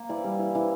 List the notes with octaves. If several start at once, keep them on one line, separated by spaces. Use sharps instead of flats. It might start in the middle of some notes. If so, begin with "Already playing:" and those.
Already playing: A#3
E3 D5
G3
E3
E3